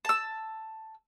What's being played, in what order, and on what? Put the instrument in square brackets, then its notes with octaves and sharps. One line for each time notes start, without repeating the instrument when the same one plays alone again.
[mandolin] A5 E6